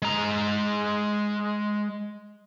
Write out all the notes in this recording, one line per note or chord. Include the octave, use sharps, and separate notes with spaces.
G#3 A#5